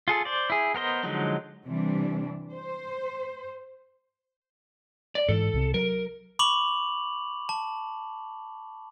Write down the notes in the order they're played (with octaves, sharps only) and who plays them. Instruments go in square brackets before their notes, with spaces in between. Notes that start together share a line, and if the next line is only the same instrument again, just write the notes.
[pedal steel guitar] F4 G#4 A4
C5 D5
E4 G#4
B3 A#4 C5 D#5
D3 F3 F#3 G#3 D#4
[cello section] C3 E3 G3 D4
C5
[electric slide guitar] D5
[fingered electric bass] G#2 E3 [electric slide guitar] A4
[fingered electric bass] C2 C3
[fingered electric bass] F#3 [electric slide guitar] A#4
[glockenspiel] B5 C#6 D6 F7 F#7
A5